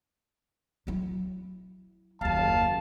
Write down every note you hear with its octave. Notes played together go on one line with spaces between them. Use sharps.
F#3 E4
F#1 D#2 F5 A5